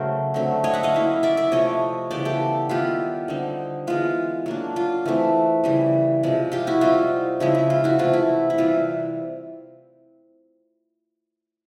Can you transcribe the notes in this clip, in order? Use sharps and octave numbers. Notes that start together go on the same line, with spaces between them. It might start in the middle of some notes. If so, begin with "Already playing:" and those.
Already playing: C#3 F#3 A3 A#4 C5
D3 F#3 A3 C4
C#5 D#5
E5 F#5
D#5 F5
F#3 A#3 C#4 E4
D5 E5
D5 E5
C3 F3 A3 C#5 D#5
C#3 E3 G3 B3 C5 D5
G4 A4
D#3 G3 B3 E4 F4 G4
D3 G3 C4 D#4
E3 G#3 B3 F4
F#3 A#3 D4
F4
E3 A3 C4
C#3 E3 G3
C3 F3 G#3
F4 G4
E4 F#4
G3 C4 D#4 F4
C#3 F3 G#3 C4 E4
E4
F4
E4 F#4
C3 E3 A3 F4
E4
E4
C3 E3 G3 C4 F4